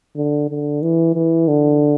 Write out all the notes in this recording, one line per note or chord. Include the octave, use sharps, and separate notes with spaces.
D3
D3
E3
E3
D3